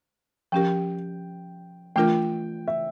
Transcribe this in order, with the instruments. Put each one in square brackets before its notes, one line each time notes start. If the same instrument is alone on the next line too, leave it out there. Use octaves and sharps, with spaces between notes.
[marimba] F3 C#4 G4 A#4 [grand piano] G5
[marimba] E3 A3 D4 F4 A#4 [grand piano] G5
[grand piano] E5